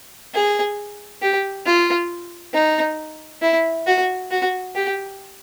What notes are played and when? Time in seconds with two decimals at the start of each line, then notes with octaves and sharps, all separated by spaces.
0.34 G#4
1.22 G4
1.66 F4
2.54 D#4
3.42 E4
3.87 F#4
4.31 F#4
4.75 G4